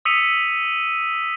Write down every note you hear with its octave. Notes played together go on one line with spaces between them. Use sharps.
D#6 E6 B6 C#7 D#7 F7